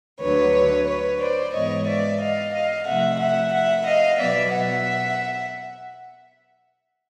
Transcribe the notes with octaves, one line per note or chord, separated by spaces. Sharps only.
D2 D3 F#3 B4 C#5
B4 C#5
C5 D5
G#2 E3 G#3 B3 C#5 D#5
D5 E5
D#5 F5
D#5 F5
C3 F3 A3 E5 F#5
E5 F#5
E5 F#5
D#5 F5
B2 F#3 B3 D5 E5
E5 F#5